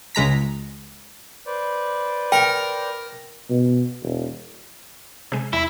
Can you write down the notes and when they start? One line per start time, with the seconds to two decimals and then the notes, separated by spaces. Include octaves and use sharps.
0.15 C#2 G#3 A#5 B6
1.46 B4 C5 D5
2.32 A#4 G5
3.50 B2
4.03 E1
5.32 C3 G#3
5.53 E2 E4